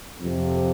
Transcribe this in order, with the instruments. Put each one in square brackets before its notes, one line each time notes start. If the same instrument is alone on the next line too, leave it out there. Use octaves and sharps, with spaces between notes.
[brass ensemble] F2 C3 F3